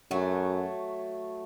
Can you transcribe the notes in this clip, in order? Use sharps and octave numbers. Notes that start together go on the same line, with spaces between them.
F#2 F#3 A3